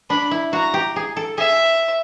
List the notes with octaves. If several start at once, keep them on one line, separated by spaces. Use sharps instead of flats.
D4 B5
E4
F#4 A#5
G4
G#4
A4
G#4 E5